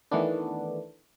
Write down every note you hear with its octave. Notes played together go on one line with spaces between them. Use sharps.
D#3 E3 A3 B3 D4